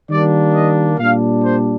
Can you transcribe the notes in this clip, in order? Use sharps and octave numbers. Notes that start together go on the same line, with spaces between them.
D#3 G3 A#3 D4 D5
D#5
A#2 G3 D4 F5
C5